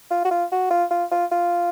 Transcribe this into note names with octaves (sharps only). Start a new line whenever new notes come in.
F4
F#4
F4
F#4
F4
F4
F4
F4